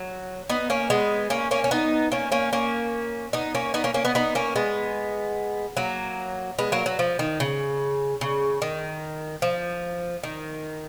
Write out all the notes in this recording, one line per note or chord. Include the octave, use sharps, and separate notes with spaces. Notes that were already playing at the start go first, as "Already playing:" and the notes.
Already playing: F#3
B3 D#4
A#3 C#4
G#3 B3
A#3 C#4
A#3 C#4
C#4
B3 D#4
A#3 C#4
A#3 C#4
A#3 C#4
B3 D#4
A#3 C#4
B3 D#4
A#3 C#4
A#3 C#4
B3 D#4
B3 D#4
A#3 C#4
G#3 B3
F#3 A#3
G#3 B3
F#3 A#3
F#3
F3
D#3
C#3
C#3
D#3
F3
D#3